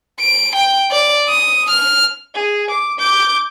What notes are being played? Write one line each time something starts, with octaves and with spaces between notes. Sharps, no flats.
D7
G5
D5
D#6
F6
G#4
D6
D6 G6